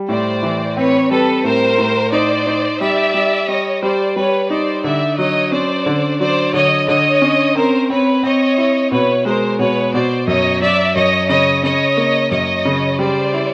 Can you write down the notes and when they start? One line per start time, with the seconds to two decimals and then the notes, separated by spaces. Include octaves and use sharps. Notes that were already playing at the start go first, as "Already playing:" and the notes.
Already playing: G3
0.09 A2 C5 D5
0.43 E3
0.77 C4 B4 C#5
1.10 G3 A4 B4
1.44 A2 A#4 C5
1.78 A2
2.12 D#4 C5 D5
2.47 D#4
2.80 G3 D5 E5
3.14 G3
3.48 G3 C#5 D#5
3.82 G3 C5 D5
4.16 G3 B4 C#5
4.50 D#4 C5 D5
4.84 D3 D5 E5
5.18 F#3 C#5 D#5
5.52 C#4 C5 D5
5.86 D3
6.20 F#3 C5 D5
6.53 D3 C#5 D#5
6.88 D3 C#5 D#5
7.22 C#4
7.56 C4 A#4 C5
7.90 C4 B4 C#5
8.23 C4 C#5 D#5
8.58 E4
8.91 B2 B4 C#5
9.25 G#3 A#4 C5
9.59 B2 B4 C#5
9.93 B2 C5 D5
10.27 F#2 C#5 D#5
10.61 F#3 D5 E5
10.95 F#2 C#5 D#5
11.29 C#3 C#5 D#5
11.63 C#3 C#5 D#5
11.97 A#3
12.31 F#2 C#5 D#5
12.65 C#3
12.99 G3 C5 D5
13.34 E4